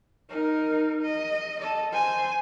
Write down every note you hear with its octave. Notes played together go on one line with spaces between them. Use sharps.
D#4 A#4
D#5
A4 D#5
C5 G#5